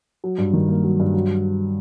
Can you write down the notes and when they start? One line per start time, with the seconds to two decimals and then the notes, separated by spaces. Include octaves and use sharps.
0.24 F#3
0.38 G2
0.53 D#3
0.68 A#3
0.84 F#3
1.00 G2
1.14 F#3